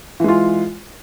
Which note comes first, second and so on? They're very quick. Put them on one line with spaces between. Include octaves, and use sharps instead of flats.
E3 G#3 F4